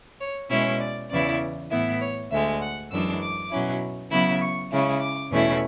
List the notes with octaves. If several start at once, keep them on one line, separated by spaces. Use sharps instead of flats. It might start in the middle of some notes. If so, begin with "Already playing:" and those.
C#5
B2 G#3 C#4 E4 C#5
D5
E2 C#3 E3 B3 E4 D5
A2 E3 B3 E4 E5
C#5
D2 D3 G#3 E5
F#5
F#2 E3 G#3 D4 E6
D6
B2 F#3 C#4 E4
C#3 F#3 B3 E4 B5
C#6
C#3 G#3 C#4 E4
D6
E2 B2 A3 C#4 E4